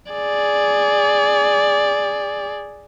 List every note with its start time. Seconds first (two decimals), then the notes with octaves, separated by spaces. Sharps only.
0.12 G#4 D5